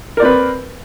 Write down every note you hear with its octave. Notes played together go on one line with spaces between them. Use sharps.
C4 A#4 B4 D5